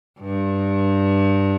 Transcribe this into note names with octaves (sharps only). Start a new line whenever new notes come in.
G2